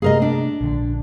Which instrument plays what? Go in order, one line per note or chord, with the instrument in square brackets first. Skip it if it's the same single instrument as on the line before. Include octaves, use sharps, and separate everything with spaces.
[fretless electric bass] C3 A3 A#3 [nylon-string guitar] G#4 A#4 D#5
[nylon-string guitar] D4
[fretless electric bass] A#1 D3